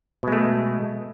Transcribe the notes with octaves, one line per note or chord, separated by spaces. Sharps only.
B2 G#3 A3